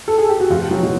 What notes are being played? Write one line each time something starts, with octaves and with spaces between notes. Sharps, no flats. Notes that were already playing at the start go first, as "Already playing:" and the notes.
A4
G#4
G4
F#4
F1 F3 F4
F#3 F#4
B2 F#3